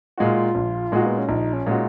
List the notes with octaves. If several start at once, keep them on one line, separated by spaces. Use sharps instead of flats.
A#2 G#3 D#4 F4 F#4
A#1
A#2 G#3 D#4 F#4
B3
C#4
A#1 D#4
C#4
A#2 G#3 D#4 F#4